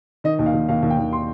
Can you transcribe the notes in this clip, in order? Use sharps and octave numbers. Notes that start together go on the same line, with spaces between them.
D#3 D#5
D#2
F5
D#2
D#2 F5
D#2
G5
D#2
C6